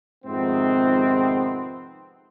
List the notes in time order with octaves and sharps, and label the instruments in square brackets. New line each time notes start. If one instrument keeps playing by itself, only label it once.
[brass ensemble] F2 G#2 C3 D#3 B3 C4